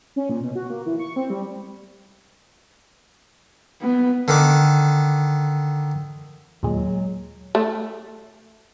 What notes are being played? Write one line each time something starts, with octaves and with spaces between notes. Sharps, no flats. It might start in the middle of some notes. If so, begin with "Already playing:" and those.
C#4
A#2
B2
F#4
A#3
E3
C#6
C4
G3
B3
D3 D#3 D6
D#2 A#2 F#3 G#3
A3